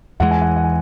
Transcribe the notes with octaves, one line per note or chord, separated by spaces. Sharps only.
E2 E3 G#3 F#5
G#5
F#5
F#5
G#5